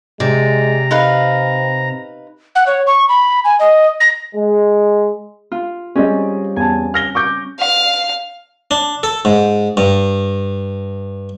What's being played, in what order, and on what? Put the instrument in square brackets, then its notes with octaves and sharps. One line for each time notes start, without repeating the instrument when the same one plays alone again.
[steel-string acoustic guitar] C3 [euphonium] G#3 [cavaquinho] D5 [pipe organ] A#5
[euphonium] C4 [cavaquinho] D#4 B4 F5
[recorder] F#5
C#5
C#6
B5
G#5
D#5
A#6
[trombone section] G#3
[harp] F4
[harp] G3 C4 C#4 [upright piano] G#4 D5 D#5
[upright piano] E2 A5 [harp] G#5
[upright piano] F6 A#6 G7
C#6 D6 G6
[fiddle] F5
[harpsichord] D4
A4
G#2
G2